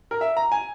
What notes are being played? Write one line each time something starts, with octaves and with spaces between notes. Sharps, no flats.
A#4
E5
A#5
G#5